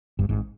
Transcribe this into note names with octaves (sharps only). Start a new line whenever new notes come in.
G1 G2
G#1 G#2